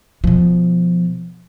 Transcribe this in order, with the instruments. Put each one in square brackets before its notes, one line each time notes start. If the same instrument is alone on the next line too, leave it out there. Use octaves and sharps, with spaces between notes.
[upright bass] B2 F3